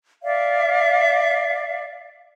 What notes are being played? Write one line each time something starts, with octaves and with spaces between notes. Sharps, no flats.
D5 E5 F5